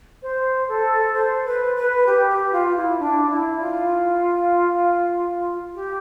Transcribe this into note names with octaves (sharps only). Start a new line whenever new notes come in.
C5
A4
C5
B4
B4
G4
G4
F4
E4
D4
E4
F4
G4